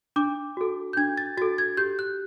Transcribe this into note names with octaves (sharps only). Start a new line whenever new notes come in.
D4 D6
F#4 A4
G6
D4 G#6
A6
F#4 A4 A6
G#6
G4 G6
F#6